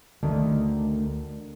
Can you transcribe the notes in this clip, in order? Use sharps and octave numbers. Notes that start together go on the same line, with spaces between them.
D2 D3 D#3 A3